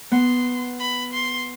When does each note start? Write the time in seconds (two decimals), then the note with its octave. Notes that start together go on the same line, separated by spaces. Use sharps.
0.11 B3 C6
0.79 B5
1.13 C6